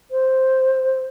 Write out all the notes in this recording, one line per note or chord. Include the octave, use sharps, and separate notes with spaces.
C5